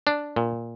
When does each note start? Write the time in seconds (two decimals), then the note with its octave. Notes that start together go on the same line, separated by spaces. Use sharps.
0.07 D4
0.36 A#2